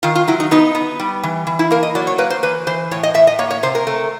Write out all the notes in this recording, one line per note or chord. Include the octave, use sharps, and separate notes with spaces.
D#3 F4
F4
F#3 E4
D#4
B3 D#4
B3
G3
E3
E3
E4
A#3 A#4
D#5
F#3 D5
C#5
A#3 B4
C5
E3 B4
E3 C5
A2 C#5
D#5
A2 E5
D#5
A#3 C#5
C#5
C3 C5
A#4
A3